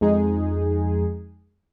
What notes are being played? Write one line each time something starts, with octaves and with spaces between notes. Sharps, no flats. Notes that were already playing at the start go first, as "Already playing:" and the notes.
F2 G#3 D#4 G#4